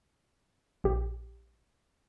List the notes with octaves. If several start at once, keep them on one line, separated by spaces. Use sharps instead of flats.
A#1 G4